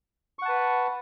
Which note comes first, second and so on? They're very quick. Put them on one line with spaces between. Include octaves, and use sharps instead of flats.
C#6 F#5 A5 B4